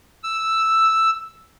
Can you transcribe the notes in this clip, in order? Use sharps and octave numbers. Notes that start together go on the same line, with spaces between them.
E6